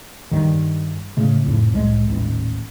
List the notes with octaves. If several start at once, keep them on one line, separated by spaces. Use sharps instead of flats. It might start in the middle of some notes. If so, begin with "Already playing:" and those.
G2 D#3
A2 C#3 A3
A1 F2 A2
C2 A2 G#3
D#1 A1